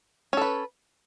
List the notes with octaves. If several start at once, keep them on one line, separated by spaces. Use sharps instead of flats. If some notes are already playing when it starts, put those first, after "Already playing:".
C#4 A4 B4